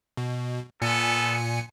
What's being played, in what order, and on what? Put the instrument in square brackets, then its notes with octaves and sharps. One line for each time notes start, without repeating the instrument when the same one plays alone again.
[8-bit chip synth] B2
[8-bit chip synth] A#2 G#5 C#7 [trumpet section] B3 A4